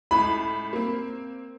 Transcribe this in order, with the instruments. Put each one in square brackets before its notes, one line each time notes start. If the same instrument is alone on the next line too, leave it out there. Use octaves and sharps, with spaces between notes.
[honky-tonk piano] C#2 A2 [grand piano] B5
[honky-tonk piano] A#3 C4